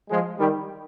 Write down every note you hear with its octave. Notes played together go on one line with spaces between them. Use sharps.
F3 G#3
D#3 G3